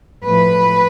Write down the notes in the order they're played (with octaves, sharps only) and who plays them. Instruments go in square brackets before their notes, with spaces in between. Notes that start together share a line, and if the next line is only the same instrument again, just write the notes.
[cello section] A2 F3 A3 B4